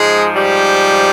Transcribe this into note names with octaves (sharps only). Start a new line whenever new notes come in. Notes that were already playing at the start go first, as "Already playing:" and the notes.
Already playing: G#2 F3 G#3 G#4
G3 G4